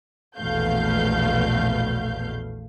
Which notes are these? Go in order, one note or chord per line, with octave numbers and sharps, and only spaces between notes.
A#1 E2 B2 A3 F5 G6